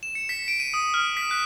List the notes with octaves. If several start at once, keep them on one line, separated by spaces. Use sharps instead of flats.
E7
C#7
B6
D7
D#7
D#6
F6
B6
F#6